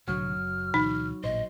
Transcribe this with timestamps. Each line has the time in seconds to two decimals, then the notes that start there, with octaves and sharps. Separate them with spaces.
0.07 C2 A2 D3 F#3 F6
0.34 F#1
0.74 D2 B2 E3 D#4
1.23 A1 A#2 C5 D#5